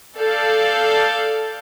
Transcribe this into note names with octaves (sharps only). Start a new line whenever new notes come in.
A4 D5 F5 G6